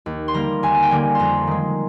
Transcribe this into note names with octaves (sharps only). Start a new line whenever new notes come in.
D#2
C6
D3 G3 A#3 A#5
D#2 G#5
G5
D3 G3 A#3 G#5
F2 A#5 C6
D#3 G#3